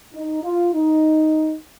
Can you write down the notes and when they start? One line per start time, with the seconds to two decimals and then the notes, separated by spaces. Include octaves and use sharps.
0.14 D#4
0.43 F4
0.74 D#4